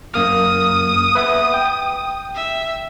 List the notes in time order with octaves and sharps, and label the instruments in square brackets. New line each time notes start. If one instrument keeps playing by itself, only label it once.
[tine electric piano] F#2 A#3 F6 [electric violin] D#6
[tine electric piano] B4 E5 F#5
G5
[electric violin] E5